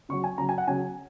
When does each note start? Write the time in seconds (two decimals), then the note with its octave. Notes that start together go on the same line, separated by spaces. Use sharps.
0.09 C#3 C#6
0.13 F#3
0.24 G#5
0.38 C#3 F#3 A#5
0.49 G#5
0.58 F#5
0.67 C#3 F#3 G#5